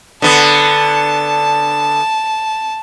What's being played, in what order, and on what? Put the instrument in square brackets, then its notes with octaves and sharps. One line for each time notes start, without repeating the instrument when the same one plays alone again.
[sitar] D3 B3 [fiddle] A5